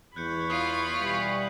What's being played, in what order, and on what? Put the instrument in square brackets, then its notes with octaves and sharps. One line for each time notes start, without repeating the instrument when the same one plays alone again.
[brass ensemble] E2 [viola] C#5 B5 [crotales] F#6 G6 C#7
[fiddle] F4 [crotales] D#6 C7 D#7
[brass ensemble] B2 E3 G3 [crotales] G6 B6 F#7